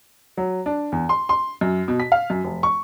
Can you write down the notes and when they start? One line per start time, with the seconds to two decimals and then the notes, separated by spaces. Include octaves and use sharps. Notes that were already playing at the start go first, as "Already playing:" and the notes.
0.37 F#3
0.66 D4
0.92 E2
1.09 C6
1.29 C6
1.61 F#2
1.88 B2
2.00 B6
2.12 F5
2.30 F#2
2.44 F1
2.63 C#6